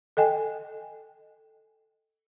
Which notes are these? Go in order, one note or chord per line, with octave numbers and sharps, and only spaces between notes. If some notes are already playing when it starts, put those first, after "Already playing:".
A4 D#5 G5 G#5